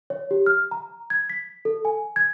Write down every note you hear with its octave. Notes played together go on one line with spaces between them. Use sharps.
C#5
G4
F6
A#5
G#6
B6
A4
G#5
G#6